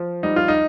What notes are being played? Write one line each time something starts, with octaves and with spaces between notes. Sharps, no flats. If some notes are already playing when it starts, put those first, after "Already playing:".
Already playing: F3
G3 D#4
F4
D#4